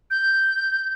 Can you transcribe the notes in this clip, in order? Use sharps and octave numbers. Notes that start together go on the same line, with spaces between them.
G6